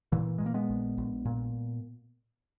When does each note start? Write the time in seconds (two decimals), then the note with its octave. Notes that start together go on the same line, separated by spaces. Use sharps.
0.12 A#2 E3
0.38 A#2 G#3
0.46 A#3
0.54 G#3 B3
0.70 A#1
0.98 A#1
1.25 A#2